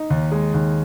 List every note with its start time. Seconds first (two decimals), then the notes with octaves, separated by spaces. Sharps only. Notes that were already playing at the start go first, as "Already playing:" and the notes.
Already playing: D#4
0.10 D#2
0.32 G#3
0.54 D#2